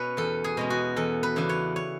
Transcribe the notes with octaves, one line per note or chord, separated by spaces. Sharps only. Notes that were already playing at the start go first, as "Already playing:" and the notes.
Already playing: B2 C#4 B4 C#5
E2 A4
G#4
B2 G#3 C#4
F#4
E2 A4
B4
C#3 E3 B3 D4
C#5
C#5